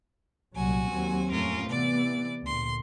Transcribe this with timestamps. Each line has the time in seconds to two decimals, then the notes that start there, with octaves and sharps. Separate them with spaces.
0.55 C2 A#2 F#3 F#4 G#5
0.91 D#2 F#3 C4
1.30 F2 A2 C#4 F4 A#4
1.68 C3 E3 B3 D5
2.45 D2 A#2 C6